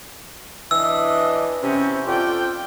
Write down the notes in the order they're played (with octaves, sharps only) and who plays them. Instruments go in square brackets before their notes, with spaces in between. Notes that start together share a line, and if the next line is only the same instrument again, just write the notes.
[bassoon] E3 [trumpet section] D4 D#5 [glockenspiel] E6
[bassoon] C3 [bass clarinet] C#4 [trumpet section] E4 F#4 C5
[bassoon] F2 [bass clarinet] F4 [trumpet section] A4 D5 G5